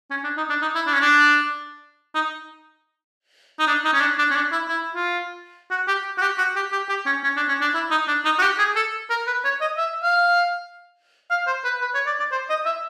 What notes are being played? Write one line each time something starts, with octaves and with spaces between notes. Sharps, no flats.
C#4
D4
D#4
D4
D#4
E4
D4
C#4
D4
D#4
D#4
D4
D#4
C#4
D4
D4
C#4
D4
E4
E4
F4
F#4
G4
F#4
G4
F#4
G4
G4
G4
C#4
C#4
D4
C#4
D4
E4
D#4
D4
D#4
F#4
G4
G#4
A4
A#4
B4
C#5
D#5
E5
F5
F5
C5
B4
B4
C#5
D5
D5
C5
D#5
E5